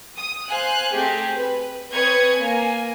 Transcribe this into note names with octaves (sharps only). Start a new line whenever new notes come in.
D#6
C5 F5 G#5 F#6
A3 C4 G4 G#4
B4
C4 B4 C#5 D#6 G#6 C#7
A#3 G#5